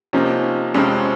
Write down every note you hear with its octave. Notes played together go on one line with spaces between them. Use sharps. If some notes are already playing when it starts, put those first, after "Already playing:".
C3 F3 A#3 C#4 D#4
F2 C3 F3 G#3 C4 C#4